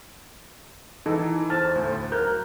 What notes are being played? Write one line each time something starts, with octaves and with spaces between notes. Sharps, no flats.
E3 D#4 A4
E4
E2 C5 A5 F6
D2 A2
F#3 A#4 F#6 G6